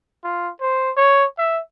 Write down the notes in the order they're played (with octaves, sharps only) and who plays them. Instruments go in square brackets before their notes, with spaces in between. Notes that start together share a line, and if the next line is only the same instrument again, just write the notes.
[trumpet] F4
C5
C#5
E5